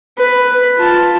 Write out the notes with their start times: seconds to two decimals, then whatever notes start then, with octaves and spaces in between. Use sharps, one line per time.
0.18 B4
0.77 F4 A5